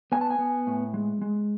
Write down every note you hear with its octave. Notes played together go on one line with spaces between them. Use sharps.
B3 G#5
A5
G#5
B3
A2
G#3
G#3